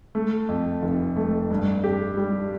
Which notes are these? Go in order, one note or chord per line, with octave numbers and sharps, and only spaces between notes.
A3
F2
F1
A3
G2
G4
G3